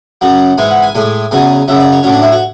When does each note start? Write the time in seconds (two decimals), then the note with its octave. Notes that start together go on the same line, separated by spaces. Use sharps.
0.21 F#2 C#3 F#3 F#5
0.58 G#2 E3 G#3 G#5
0.70 F#5
0.82 G#5
0.95 A2 G#3 G#5
1.31 E2 C#3 F#3 G#5
1.68 F#2 C#3 F#3 E5
1.80 D5
1.92 C#5
2.03 A2 F#3 C#4
2.13 D4
2.22 E4
2.32 F#4